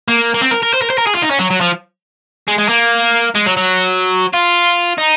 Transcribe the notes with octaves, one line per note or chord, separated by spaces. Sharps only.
A#3
A#3
C4
A#4
A#4
C5
A#4
C5
A#4
G#4
F4
D#4
C#4
F#3
F#3
F3
G#3
G#3
A#3
G#3
F#3
F#3
F4
D#4